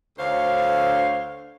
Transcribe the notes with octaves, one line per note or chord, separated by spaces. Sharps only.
D2 D3 C5 C#5 F5